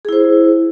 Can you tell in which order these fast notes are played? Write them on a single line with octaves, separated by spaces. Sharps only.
G#4 E4 C5